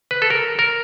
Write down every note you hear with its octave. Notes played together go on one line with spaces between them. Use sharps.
B4
A4
A#4
A#4